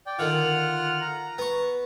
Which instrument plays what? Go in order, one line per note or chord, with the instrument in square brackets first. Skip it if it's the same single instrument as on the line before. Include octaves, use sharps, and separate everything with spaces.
[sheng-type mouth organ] D5 G5
[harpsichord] D3 D#3 [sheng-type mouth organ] F4 F#5 F6
[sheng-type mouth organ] A#5
[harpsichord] B3 C#6